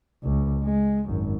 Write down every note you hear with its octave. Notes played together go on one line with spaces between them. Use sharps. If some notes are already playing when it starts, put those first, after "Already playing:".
C#2
G#3
G#1 F#2